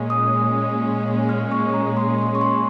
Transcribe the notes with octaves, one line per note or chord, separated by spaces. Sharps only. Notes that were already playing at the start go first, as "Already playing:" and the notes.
Already playing: A#2 G#3 C#4
D#6
F6
C#6
A#5
C6
C6
C#6
C6